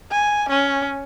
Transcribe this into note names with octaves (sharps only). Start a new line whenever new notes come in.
G#5
C#4